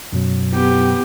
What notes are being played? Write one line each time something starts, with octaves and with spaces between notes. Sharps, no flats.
F#2 B2 F#3
B3 G4